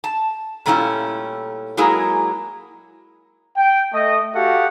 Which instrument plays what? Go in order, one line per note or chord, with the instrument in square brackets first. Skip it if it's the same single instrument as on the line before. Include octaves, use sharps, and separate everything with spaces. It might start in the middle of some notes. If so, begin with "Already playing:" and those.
[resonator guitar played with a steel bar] A5
A#2 G3 A3 C#4 E4 F4
F#3 G#3 A#3 E4 G#4 A#4
[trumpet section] G5
A3 D#5
F#4 G4 A4 F5 F#5